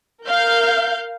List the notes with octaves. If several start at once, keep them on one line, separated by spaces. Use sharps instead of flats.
A#4 F5 G6